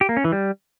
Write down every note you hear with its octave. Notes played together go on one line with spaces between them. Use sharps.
G4
A#3
C#4
E3
G3